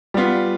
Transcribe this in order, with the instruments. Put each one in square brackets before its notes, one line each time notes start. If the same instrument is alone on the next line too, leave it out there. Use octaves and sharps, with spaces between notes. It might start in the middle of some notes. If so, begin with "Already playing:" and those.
[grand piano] G3 B3 F4